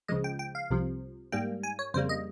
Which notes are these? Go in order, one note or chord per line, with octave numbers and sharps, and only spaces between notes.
C#2 C#3 F3 G#3 D#5
G5
G5
F5
C2 C3 F3
G#2 G3 A#3 G5
G#5
C#5
F2 C#3 G3 A#3 C5
D#5